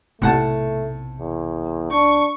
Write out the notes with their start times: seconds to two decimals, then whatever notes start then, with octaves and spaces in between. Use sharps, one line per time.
0.22 B1 A2 C3 A3 F#5 A5
1.19 E2
1.91 D4 C#6